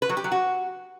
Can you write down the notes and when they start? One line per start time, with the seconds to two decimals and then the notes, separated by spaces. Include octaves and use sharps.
0.02 B4
0.09 F#3
0.17 G4
0.24 F#3
0.32 F#4